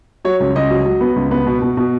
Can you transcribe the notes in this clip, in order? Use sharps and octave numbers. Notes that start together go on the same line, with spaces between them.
F#3 C#5
C#2
C#2 D#5
F#3
F#3
B3
C#2
B3
B2
B2
B2